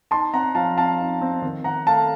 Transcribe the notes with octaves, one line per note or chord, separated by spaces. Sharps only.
D#4 A5 C6
C4 F#5 A#5
F3 F5 A5
C4 F5 A5
D#4
C4
D#3
D#3 F#5 A#5
A3 F5 A5